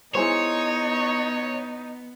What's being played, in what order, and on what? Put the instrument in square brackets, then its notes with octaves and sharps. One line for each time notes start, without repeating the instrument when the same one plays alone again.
[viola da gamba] B3 [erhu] D#4 [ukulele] E4 G#4 C5 [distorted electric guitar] C#5